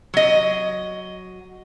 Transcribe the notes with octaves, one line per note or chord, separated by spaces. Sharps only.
F#3 D#5